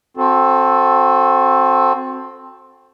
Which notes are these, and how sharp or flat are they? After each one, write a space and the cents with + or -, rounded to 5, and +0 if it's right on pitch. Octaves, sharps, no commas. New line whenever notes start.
C4 +10 F#4 -20 A4 +0